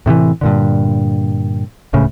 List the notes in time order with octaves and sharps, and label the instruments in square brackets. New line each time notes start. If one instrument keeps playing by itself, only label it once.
[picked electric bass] A2 C3 D#3 E3
G2 A#2 D3
D1 C#2 A2 C#3